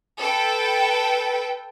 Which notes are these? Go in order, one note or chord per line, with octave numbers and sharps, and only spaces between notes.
A4 B4 G5